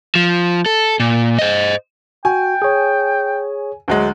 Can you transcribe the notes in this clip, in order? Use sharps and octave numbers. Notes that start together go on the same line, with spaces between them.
F3
A4
A#2
C5 D#5
F#4 G5 G#5
G#4 C#5
D2 F#3 G#3